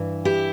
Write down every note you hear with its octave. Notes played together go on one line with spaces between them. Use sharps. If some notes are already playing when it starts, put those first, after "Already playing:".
Already playing: G2 E3
E4 G4